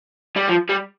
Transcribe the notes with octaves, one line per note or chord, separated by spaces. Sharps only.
G3
F3
G3